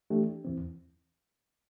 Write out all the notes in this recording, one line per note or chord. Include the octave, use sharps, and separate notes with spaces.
E3 A3 D4 G4
E2 E3 C4